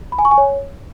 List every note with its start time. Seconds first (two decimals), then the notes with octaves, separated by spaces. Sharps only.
0.12 B5
0.19 G#5
0.25 C#6
0.31 G#5
0.38 C#5